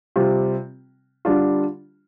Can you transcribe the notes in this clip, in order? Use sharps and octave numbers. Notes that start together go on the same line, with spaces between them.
C3 G3 C4 F4
D3 G3 D4 F4